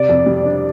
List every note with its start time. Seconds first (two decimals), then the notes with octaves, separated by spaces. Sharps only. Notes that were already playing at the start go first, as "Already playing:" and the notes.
Already playing: C3 D5
0.09 F2
0.26 G3
0.45 D4